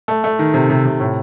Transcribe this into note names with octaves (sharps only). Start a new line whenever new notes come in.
A3
A3
D#3
C3
C3
C3
A2